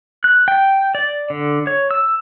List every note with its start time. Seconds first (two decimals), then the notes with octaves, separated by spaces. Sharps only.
0.24 F#6
0.48 G5
0.95 D5
1.30 D3
1.67 C#5
1.91 E6